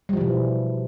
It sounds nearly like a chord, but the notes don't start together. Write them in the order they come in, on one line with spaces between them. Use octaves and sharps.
G3 F3 E3 B2